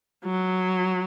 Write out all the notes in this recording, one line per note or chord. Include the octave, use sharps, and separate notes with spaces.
F#3